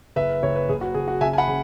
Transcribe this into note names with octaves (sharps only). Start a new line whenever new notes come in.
F#1 B4 E5
F#1 C#5
B4
F#1 G#4
F#4
F#1 G#4
F#4
C#3 E5 G#5
G#5
F#5 B5
C#3